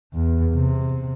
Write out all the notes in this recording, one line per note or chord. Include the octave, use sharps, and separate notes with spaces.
E2
C3